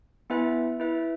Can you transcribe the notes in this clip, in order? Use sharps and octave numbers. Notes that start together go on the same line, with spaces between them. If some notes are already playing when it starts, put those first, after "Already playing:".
B3 E4 B4 E5 G#5
E4 B4 E5